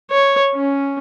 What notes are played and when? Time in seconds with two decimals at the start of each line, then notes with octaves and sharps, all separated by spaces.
0.11 C#5
0.54 C#4